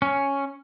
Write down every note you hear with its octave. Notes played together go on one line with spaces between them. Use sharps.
C#4